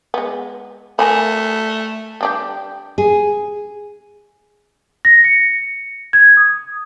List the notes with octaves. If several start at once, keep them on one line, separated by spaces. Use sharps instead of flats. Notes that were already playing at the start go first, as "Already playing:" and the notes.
G#3 B3
A3 A#4 G#5 B5
G3 D4 G4
G#4
A#6
C#7
G#6
D#6